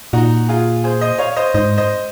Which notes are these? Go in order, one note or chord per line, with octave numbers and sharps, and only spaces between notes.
A#2 D#4 F#4
F4 G#4
G#4 C5
C5 D#5
C#5 F5
C5 D#5
G#2 C5 D#5
C5 D#5